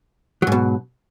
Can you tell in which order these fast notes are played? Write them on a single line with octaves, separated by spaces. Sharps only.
F#3 G#2 B2